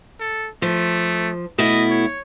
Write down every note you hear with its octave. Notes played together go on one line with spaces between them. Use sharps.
A4
F3 A3
B2 A3 E4 D#5
C#5